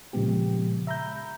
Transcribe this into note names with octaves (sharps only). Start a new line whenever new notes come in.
A#2 C#3 F3 G#3 B3 G4
E5 A#5 B5 G6